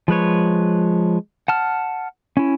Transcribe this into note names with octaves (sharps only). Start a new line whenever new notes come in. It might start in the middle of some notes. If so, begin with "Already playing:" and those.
F3 G#3 B4 C#5
F#5 A5 F6
C#4 E4